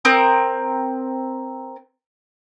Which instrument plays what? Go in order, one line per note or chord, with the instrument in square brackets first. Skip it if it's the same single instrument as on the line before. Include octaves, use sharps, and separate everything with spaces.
[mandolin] C4 A#4 D#6